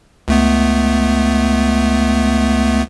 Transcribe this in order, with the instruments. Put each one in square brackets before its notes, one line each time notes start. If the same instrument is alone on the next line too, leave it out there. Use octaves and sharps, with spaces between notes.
[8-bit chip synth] C#2 A3 B3